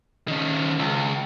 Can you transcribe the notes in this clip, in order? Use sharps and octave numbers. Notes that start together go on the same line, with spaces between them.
D#3 C#4
C#2